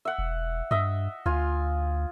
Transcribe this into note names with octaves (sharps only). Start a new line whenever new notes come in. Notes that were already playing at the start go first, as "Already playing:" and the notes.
E5 F#5
E1
G2 D#5 E5
D2 F4 G#5